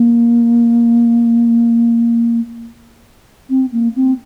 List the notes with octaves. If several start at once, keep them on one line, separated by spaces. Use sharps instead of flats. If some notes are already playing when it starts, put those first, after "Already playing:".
Already playing: A#3
C4
A#3
C4